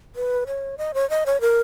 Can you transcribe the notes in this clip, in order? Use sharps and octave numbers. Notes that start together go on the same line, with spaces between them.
B4
C#5
D#5
C#5
D#5
C#5
A#4